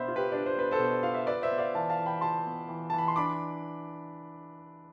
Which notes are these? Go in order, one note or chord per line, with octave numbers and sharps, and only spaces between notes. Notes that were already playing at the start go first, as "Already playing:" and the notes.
Already playing: B2 B3 D4 C5 E5 B5
F4
G4 B4
D4 D5
C5
B3 B4
A4 C5
B2
F4 F5
E5
F4 B4 D5
C5 E5
B3
D5 F5
E3 F5 A5
F5 A5
E3
G5 B5
F4 A5 C6
B3
E3
E3 A5
B5
C6
D4 B5 D6